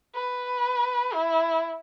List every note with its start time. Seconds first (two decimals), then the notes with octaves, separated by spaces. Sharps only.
0.15 B4
1.14 E4